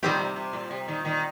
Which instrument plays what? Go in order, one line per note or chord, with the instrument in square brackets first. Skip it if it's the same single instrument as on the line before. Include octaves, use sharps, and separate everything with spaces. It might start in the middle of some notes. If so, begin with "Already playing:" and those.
[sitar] A#2 D#3 [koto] G3 C4 G4
[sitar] C3
C3
A#2
C3
A#2 D#3
A#2 D#3